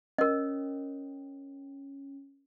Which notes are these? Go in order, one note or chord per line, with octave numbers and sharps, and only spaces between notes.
C#4 A#4 D#5